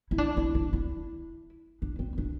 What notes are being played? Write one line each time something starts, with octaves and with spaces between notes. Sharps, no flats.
E4
D4
E4
D4
E4
D4
C4
D4